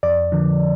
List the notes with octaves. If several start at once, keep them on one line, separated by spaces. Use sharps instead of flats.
F2 D5
D3 F3